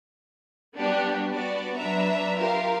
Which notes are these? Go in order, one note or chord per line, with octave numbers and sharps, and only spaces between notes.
G3 B3 D4 F#4 G4
B3 F#4 D5
F#3 D4 B4 E5 A#5
F4 G4 A#4 F5